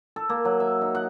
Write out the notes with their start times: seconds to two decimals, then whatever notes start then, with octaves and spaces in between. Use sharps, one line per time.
0.16 A4
0.29 A#3
0.45 F#3
0.60 E5
0.81 D#4
0.95 F#5